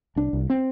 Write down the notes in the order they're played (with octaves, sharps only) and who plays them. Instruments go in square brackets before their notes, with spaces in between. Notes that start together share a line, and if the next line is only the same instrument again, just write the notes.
[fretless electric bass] C2 D4
C2
C4